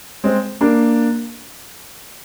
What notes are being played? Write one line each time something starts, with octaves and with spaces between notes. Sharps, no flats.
G#3 C4
A#3 D4